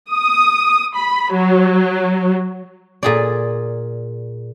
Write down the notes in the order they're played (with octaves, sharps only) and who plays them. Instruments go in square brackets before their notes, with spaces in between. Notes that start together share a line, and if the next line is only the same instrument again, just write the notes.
[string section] D#6
B5
F#3
[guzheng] A#2 G#4 D5